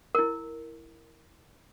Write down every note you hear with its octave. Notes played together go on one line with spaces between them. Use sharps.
E4 A#4